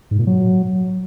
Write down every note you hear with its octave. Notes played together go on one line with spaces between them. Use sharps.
G#2
A#2
F#3